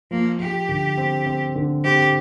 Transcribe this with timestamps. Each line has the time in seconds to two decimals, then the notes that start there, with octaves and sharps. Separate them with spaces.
0.11 F3 A#3
0.40 F3 G4
0.69 D3
0.98 C4
1.26 C4
1.55 D3
1.84 C4 G4